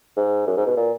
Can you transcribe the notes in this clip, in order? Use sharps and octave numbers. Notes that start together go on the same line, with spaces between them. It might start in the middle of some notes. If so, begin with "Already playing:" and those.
G#2
F#2
G#2
B2
A#2